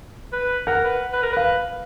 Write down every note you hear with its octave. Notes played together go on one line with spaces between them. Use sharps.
B4
A#4 F#5
B4
B4
A#4
B4 F5